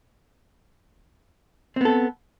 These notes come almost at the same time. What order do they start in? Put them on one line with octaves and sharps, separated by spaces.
C4 B3 A4